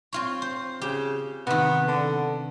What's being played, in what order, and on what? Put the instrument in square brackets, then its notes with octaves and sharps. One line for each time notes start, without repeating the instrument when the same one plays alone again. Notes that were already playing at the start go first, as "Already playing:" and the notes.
[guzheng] C4 F4 C#5
C5
[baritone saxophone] C#3 [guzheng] G4
[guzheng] C3 D#3 [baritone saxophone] B3
[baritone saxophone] D3